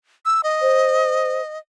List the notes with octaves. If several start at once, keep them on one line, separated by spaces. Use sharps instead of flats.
E6
D#5
C5